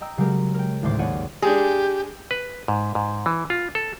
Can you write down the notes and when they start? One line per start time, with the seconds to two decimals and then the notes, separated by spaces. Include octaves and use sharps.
0.01 D#5 G5 A#5 E6
0.17 C#3 F#3 G#3 G4 A#4
0.54 A#4 G5
0.82 G#1 D2 A2 D4 C5 D6
0.99 D#2 C#5 D5 F#5 C#7 D#7
1.42 G#3 D4 G4 G#4
2.31 B4
2.68 G#2
2.95 G#2
3.26 E3
3.50 F4
3.75 A4